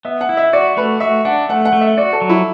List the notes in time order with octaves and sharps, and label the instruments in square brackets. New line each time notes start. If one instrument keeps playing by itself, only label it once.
[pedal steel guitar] B3 [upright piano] E5
[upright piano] F#5
[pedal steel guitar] E4
[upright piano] E5
[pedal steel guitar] F#4 [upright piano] D5
[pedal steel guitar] A3 [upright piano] B4
[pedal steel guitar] F#4 [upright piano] E5
[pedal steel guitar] D4 [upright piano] F#5
[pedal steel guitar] A3 [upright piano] F#5
[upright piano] F#5
[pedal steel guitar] A3
[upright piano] E5
[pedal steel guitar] F#4 [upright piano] D5
[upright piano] A4
[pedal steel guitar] F#3
[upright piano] E4